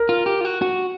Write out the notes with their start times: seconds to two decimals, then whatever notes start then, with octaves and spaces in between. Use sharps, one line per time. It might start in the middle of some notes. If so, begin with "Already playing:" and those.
Already playing: A#4
0.09 F4
0.26 G4
0.41 F4
0.45 F#4
0.62 F#4